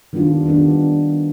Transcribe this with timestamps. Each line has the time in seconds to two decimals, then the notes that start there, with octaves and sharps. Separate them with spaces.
0.13 D#3 G3 B3 D4 F4
0.46 D#3 G3 B3 D4 F4